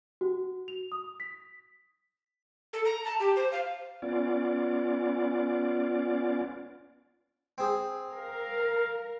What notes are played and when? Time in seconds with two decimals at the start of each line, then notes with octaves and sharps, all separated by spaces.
0.21 F#4
0.68 F7
0.92 D#6
1.20 B6
2.73 A4
2.85 A#5
3.04 A5
3.20 G4
3.36 C5
3.52 F5
4.02 B3 C#4 F4 D5
7.58 C4 G#4
8.12 A#4 F5